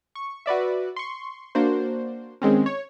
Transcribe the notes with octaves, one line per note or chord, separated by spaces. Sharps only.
C#6
F#4 B4 D5 E5
C6 C#6
A#3 D4 F#4 C5
D#3 G#3 C4 C#4
C#5